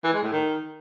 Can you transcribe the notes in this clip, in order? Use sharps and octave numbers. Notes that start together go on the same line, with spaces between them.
E3
G#3
A2
D#3